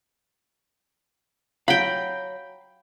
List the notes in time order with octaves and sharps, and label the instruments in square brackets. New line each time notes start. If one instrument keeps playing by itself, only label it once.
[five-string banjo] F#3 [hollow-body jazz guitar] F5 [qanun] G5 B5